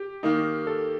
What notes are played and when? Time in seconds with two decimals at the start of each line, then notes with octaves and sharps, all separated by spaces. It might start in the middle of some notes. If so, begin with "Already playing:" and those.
Already playing: G4
0.23 D#3 A#3 D#4
0.67 A4